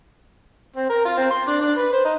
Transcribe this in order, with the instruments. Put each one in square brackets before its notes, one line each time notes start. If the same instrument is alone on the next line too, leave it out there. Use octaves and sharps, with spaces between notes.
[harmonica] C4
A#4
F4
C4
C6
D4
D4
B4
C5
D#4